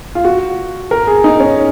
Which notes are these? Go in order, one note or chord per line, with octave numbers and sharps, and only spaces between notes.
F4
F#4
A#4
G#4
D#4
C#4